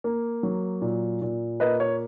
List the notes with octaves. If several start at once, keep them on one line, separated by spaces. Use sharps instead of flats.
A#3
F#3
A#2
A#2
A#3 B4 D#5
C#5